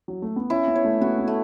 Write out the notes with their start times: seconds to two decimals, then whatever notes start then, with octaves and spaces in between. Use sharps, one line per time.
0.08 F#3
0.22 A3
0.36 B3
0.50 C#4 E4
0.68 B3
0.75 C#5
0.84 A3
1.01 B3 F#4
1.19 B3
1.28 A3